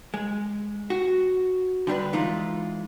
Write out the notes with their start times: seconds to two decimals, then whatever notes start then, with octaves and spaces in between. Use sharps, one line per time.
0.14 G#3
0.90 F#4
1.87 D3 G3 D4 B4
2.13 E3 G#3 D#4 F4